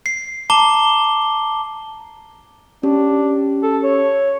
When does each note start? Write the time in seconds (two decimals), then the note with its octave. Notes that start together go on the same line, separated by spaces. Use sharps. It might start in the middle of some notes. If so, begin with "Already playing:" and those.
0.06 C7
0.50 A5 A#5 D6 G7
2.83 C#4 D4 G4
3.63 A4
3.83 C#5